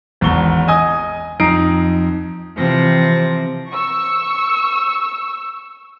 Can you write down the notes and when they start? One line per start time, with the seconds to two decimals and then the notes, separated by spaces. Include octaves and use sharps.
0.21 G#1 E2 G#2 C#6 G7
0.68 D#5 G#5 D#6
1.40 F2 D#4 A#5 D#6 C7 D7
2.56 C3 E3 F3 C4 A#6
3.71 C#6 E6